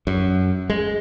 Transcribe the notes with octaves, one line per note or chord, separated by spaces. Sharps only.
F#2
G#3